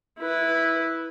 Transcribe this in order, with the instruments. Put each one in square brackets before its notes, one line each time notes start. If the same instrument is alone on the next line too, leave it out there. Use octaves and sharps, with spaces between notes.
[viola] E4 B4